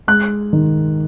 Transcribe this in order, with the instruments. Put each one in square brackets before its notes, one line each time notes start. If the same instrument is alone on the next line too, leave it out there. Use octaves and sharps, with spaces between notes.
[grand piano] G#3 F#6
D#3